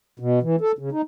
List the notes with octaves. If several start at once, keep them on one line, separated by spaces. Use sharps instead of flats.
B2
E3
A4
C#3
D#4